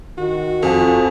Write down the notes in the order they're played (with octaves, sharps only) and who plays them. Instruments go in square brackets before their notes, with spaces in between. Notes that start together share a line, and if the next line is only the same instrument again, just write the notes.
[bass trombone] D#3 [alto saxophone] F#4
[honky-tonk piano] F2 [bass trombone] F3 [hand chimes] A4 G#5